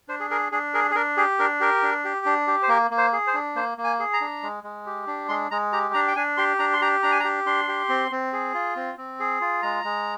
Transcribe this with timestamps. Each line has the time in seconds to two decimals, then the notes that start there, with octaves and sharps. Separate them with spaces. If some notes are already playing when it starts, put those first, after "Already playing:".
0.08 D4 C5
0.20 G#4
0.30 G#4 A#4
0.52 D4 G#4
0.74 G#4 A#4
0.91 G#4
0.95 D4 A#4
1.17 G4 G#4
1.39 D4 A#4
1.60 G4 A#4
1.83 D4
2.04 G4
2.26 D4
2.47 G4
2.63 C5
2.69 A#3 A#4
2.91 A#3
2.98 C5
3.12 G#4
3.27 C5
3.34 D4
3.56 A#3 C5
3.78 A#3
3.84 G#5
3.99 G#4
4.13 A#5
4.21 D4
4.43 G#3
4.64 G#3
4.86 G4
5.07 D4
5.29 G#3 C6
5.51 G#3 A#5
5.73 G4 A#5
5.94 D4 A#5
6.08 G5
6.16 D4 G#5
6.37 G4 C6
6.59 D4 A#5
6.74 C6
6.82 G4 A#5
7.03 D4 A#5
7.12 G#5
7.20 A#5
7.24 G4
7.46 D4 C6
7.68 G4
7.89 C4
8.11 C4
8.33 G#4
8.54 F4
8.76 C4
8.98 C4
9.20 G#4
9.41 F4
9.62 G#3 A#5
9.84 G#3